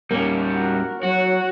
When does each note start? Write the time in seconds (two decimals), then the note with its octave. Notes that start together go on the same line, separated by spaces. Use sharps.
0.11 G3 A#3 C#4
0.53 F#4 A#4
1.03 F#3 F#4 C#5 F#5